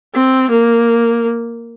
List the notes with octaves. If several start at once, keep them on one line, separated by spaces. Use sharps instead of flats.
C4
A#3